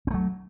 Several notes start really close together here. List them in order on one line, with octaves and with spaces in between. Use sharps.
C4 A3 F#3